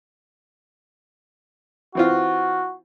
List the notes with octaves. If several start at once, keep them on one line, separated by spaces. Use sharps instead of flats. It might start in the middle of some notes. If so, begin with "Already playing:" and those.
E3 C4 F4 F#4